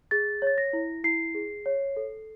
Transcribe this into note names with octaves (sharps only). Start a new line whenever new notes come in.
G#4 A6
C#5 A6
A#6
E4
E4 C7
G#4
C#5
A4